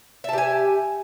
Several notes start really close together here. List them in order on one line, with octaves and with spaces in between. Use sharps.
E5 A5 G4 G#5